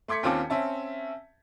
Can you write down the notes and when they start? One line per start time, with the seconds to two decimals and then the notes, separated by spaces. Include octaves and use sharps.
0.08 A3 C6 D6 G#6 B6 C#7
0.23 D#2 C4 C#4 F4 A5 D6
0.50 C4 C#4 E5 A5